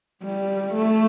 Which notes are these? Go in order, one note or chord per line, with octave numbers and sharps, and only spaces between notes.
G3
A3